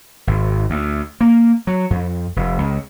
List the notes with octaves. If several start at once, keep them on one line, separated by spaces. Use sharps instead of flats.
G#1
D2
A#3
F#3
F2
F1
C#2